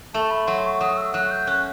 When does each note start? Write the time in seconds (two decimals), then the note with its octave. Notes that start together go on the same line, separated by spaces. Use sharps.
0.14 A3 A5
0.31 B5
0.47 F#3 C6
0.64 C#6
0.81 F#3 D#6
0.97 E6
1.14 F#3 F#6
1.31 G6
1.47 C#4 F#6